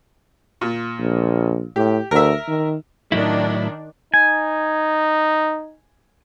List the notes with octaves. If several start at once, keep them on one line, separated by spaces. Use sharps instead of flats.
A#2
A#1
A2 G4
D2 A#4 E5
D#3
A2 D#3 F#3 D4 E4
D#4 G#5